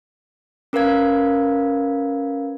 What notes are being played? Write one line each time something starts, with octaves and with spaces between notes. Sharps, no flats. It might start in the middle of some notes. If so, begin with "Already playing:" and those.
C#4 A#4 B4 F5 G#6